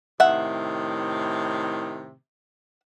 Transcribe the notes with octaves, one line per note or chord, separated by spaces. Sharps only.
A2 C3 D#3 E5 F#5